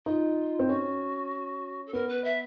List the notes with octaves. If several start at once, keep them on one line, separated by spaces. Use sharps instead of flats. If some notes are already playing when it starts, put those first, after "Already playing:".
D#4 F4
C4
C#4 F#4
A4
B3 A#4
B4
E5